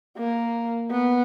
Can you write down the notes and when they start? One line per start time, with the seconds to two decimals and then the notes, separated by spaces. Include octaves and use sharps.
0.18 A#3
0.91 B3